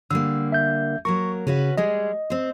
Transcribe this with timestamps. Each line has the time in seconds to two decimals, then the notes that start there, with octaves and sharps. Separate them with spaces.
0.11 D3 G3 A#3 E6
0.52 E5 G6
1.05 F#3 A#3 A#4 C#6
1.47 C#3 C#4 F#4 B4
1.77 G3 G#3 G#4 D#5
2.30 C4 C5